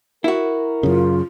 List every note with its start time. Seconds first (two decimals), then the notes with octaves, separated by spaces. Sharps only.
0.24 E4 F#4 A#4
0.83 F#2 C#3 F4